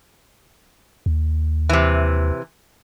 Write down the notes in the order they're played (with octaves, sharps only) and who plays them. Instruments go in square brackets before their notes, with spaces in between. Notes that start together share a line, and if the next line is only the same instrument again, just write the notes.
[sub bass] D#2
[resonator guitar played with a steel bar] C3 E3